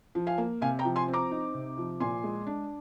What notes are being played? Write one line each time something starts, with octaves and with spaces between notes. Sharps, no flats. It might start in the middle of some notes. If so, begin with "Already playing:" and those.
F3
F5 G#5
A#3
C3 F5 G#5
G5 A#5
F3
G#5 C6
C4
A#5 D6
D#4
C3
F3
A#2 G#5 C6
G#3
D4